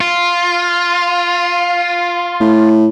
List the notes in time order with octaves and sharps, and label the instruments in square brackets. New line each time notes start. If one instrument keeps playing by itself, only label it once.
[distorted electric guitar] F4
[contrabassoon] A2